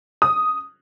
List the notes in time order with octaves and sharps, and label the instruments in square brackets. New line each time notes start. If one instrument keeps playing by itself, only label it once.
[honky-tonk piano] D#6